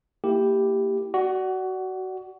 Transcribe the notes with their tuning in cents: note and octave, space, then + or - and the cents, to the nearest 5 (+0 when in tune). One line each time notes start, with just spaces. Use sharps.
A#3 -25 E4 +0 G4 +0
F#4 +20 D5 +0